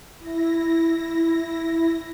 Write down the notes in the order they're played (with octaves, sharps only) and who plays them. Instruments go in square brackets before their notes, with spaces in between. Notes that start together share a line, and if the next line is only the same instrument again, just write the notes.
[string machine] E4 A#6